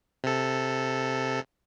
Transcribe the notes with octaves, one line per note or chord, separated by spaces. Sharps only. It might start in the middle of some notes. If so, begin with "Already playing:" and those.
C3 A4